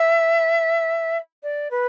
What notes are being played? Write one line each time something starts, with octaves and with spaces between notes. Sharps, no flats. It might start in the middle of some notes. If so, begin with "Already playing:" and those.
Already playing: E5
D5
B4